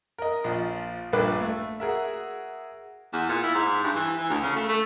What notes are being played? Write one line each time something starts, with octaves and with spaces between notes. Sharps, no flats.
A#4 D#5
A#1 F3
A#1 G2 B4 D6
A3
F#4 G#4 A#4 E5
E2
A#2
E4
G#2
G2
E3
E3
D2
C#3
A3
A3